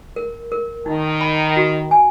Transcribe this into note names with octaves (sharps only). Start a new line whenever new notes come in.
A#4
A#4
D#3 D#4
B5
F#4
G#5